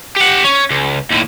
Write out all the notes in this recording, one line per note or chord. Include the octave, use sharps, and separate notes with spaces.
G4 F#5
C#4
C#2
D#2 A2